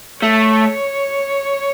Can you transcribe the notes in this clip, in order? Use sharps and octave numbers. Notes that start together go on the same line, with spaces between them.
A3 C#5